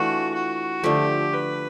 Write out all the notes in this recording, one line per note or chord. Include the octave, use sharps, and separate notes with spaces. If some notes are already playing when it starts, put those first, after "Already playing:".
Already playing: E3 A3 D4 F4 F#4
F#4
D3 F3 A3 G4
B4